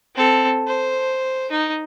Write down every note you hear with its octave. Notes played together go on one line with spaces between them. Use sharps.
C4 A4
C5
D#4